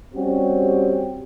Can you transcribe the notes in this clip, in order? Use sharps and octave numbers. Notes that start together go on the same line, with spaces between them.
G3 C4 C#4 F#4 G4